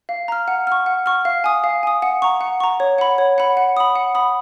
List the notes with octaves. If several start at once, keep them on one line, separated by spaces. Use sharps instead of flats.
F5
A#5 F6
F#5
C#6 F6
F#5
C#6 F6
F5
G#5 D#6
F5
G#5 D#6
F#5
A#5 C#6
F#5
A#5 C#6
C#5
F#5 B5
C#5
F#5 B5
F#5
B5 D#6
F#5
B5 D#6